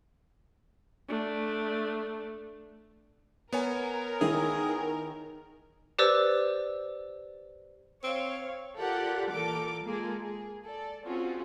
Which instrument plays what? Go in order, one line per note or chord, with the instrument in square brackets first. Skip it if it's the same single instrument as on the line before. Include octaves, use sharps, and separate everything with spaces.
[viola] A3 D4
[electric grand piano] B3 C#5 G#5 [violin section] A#4
[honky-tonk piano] D#3 D#4 E4 [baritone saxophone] G#4
[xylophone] G4 B4 C5 D5 E6
[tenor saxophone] C4 [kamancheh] C#5 F5
[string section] F4 G4 A4 A#4 D5 F#5
A#2 E3 A4 A#4 D6
G#3 A#3 F4 G#4 A4
G#4
A4 D5
C4 C#4 F4 F#4 G#4